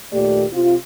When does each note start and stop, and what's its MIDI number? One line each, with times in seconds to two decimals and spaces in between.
0.12 0.44 39
0.12 0.44 46
0.12 0.44 57
0.12 0.44 67
0.12 0.44 74
0.52 0.75 48
0.52 0.75 60
0.52 0.75 65